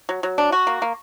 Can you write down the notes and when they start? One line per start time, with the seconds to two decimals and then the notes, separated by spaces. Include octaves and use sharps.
0.09 F#3
0.23 F#3
0.38 D4
0.52 F#4
0.67 A#3
0.82 A#3